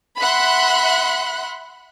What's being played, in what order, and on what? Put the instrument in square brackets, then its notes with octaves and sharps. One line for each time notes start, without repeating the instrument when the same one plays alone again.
[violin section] E5 F#5 B5 C6 F#6